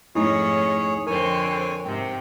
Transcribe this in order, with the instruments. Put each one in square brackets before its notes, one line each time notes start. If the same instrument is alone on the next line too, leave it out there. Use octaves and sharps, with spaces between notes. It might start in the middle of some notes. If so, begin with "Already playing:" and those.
[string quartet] F2 G#2 C#4 [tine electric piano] A3 D#4 E4 [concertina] G#4 C#5
[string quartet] F2 D3 C4 [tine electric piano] A#4 [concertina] C#5 G#5
[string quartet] G#2 C3 [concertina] C4